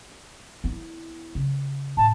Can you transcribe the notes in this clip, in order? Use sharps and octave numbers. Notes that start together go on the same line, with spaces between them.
B3 E4
C#3
A2 A5